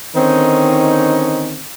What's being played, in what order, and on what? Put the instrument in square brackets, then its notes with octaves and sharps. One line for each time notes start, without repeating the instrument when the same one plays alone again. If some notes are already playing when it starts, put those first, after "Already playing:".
[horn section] D3 D#3 C4 C#4 D#4